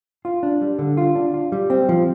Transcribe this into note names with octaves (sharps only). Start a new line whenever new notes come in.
F4
D4
G3
D3
F4
D4
F4
G3
C4
F3